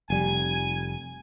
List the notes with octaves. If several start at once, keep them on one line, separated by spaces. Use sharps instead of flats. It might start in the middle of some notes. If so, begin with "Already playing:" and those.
F1 G3 G#5